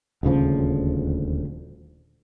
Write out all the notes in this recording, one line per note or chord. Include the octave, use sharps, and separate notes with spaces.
D#1 D2 C#3 F3